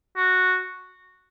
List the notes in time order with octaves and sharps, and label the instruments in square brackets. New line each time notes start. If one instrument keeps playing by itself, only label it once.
[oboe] F#4